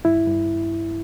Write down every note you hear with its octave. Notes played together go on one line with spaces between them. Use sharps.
G2 E4
G2